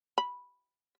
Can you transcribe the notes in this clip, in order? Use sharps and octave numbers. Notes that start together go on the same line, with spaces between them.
B5